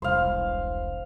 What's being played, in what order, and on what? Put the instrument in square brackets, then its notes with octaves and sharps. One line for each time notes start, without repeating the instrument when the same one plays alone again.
[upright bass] E1 C2 [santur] C5 F5